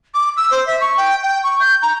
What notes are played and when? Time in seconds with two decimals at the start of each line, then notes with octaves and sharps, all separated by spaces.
0.14 D6
0.36 E6
0.51 C5
0.66 E5
0.80 C#6
0.97 G5
1.22 G5
1.43 C#6
1.59 G6
1.82 A#5